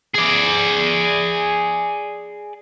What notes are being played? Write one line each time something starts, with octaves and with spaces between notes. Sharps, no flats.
G#4 D5